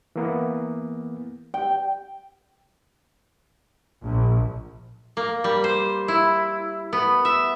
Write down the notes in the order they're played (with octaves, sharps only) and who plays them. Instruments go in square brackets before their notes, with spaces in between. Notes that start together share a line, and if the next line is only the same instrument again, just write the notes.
[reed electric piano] E3 A#3 B3
[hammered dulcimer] G5
[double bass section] A#1
[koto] A#3
G3
C5
E4
B3
E5